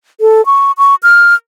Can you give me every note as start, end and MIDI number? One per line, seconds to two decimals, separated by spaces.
0.21 0.44 69
0.46 0.72 85
0.78 0.95 85
1.03 1.35 89